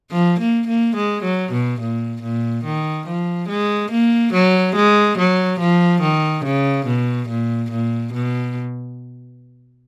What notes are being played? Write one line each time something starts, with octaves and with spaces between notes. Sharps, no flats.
F3
A#3
A#3
G#3
F#3
B2
A#2
A#2
D#3
F3
G#3
A#3
F#3
G#3
F#3
F3
D#3
C#3
B2
A#2
A#2
B2